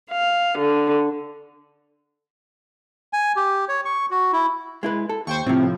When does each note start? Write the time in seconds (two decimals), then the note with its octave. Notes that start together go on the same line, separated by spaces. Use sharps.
0.11 F5
0.59 D3
3.13 G#5
3.36 G4
3.69 C#5
3.85 C#6
4.11 F#4
4.33 E4
4.83 G#3 E4 B4
5.09 A4
5.27 D#2 C5 G5 C#6
5.46 A2 C3 F3 C4